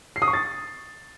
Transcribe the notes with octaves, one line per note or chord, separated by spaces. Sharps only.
C7
D#6
C#6
A6